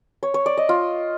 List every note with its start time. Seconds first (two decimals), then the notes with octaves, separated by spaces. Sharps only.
0.23 C#5
0.34 C#5
0.46 D5
0.57 D#5
0.69 F4